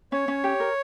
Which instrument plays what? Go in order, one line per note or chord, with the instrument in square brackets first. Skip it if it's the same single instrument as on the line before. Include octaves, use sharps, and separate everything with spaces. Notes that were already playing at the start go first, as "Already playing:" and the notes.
[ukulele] C#4 [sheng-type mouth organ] C#5
[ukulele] C#4
G4
A#4